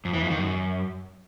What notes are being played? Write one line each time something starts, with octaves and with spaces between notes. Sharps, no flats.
F2
E3
F2
D#3
F#2